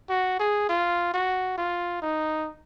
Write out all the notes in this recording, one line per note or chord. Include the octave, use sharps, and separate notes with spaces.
F#4
G#4
F4
F#4
F4
D#4